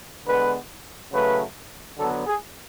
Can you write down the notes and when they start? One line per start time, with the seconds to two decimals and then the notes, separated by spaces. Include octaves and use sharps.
0.26 D3 G#3 B3 B4
1.12 C#3 F#3 A3 B4
1.97 D3 F#3 B3 A4
2.27 G#4